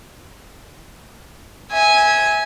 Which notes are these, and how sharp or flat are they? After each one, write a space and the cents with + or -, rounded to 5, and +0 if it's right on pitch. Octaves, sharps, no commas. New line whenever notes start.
E5 -30 G#5 +0